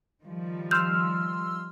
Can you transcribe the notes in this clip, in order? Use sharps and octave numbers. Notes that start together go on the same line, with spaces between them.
D#3 F3 G3
C6 E6 F6 G6